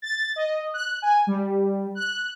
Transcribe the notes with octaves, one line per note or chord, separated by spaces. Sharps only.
A6
D#5
F#6
G#5
G3
F#6